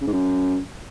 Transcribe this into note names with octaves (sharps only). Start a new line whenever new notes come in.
C#3
G#2
F#2